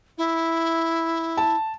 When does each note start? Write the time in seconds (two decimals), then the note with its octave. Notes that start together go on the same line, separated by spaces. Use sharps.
0.18 E4
1.37 A5